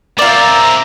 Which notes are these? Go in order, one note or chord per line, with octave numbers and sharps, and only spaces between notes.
C4 F4 A#4 D5 E5 A#5